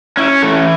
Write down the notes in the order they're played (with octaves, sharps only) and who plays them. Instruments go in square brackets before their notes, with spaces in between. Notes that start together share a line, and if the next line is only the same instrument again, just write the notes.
[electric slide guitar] C#4 E4
E3 A3 A4